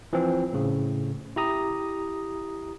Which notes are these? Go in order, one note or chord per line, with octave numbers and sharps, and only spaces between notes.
E3 F3 C4
A2 C#3
E4 G4 A#5 D#6